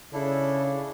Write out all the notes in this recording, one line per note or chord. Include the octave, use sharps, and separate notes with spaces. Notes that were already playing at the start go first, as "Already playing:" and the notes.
C#3 D4 E4 A4